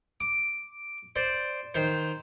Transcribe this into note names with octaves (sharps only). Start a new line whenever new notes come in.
D6
C5 D5
D#3 C5